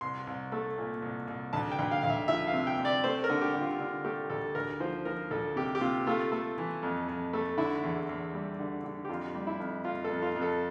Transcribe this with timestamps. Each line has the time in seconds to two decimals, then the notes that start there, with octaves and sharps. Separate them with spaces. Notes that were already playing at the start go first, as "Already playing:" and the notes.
0.01 C2 C6
0.27 C2
0.52 A3
0.78 A#2
1.02 C2
1.27 C2
1.53 D2 A5
1.72 G5
1.79 D2
1.91 F5
2.03 D2 F5
2.10 E5
2.28 F3 E5
2.47 F5
2.54 C3
2.67 G5
2.79 C3
2.85 D5
3.04 A3 C5
3.24 A#4
3.30 D3
3.41 G4
3.55 D3
3.61 F4
3.79 D3
4.05 A3 G4
4.30 D2 A4
4.55 D2 A#4
4.80 F3 C5
5.05 F3 A#4
5.31 D2 A4
5.56 C3 G4
5.75 G4
5.81 C3 F4
6.07 A3 F4
6.32 A3
6.58 E3
6.83 F2
7.08 F2
7.33 A3
7.57 D3 E4
7.83 E2
8.09 E2
8.33 G3
8.59 D3
8.84 D3
9.05 G4
9.09 F2 F4
9.35 G3
9.47 E4
9.60 F2
9.85 F2 F4
10.04 A4
10.10 F2
10.22 F4
10.36 F2
10.42 A4